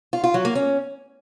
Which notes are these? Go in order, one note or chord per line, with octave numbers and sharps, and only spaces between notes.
F4
F4
F#3
A#3
C#4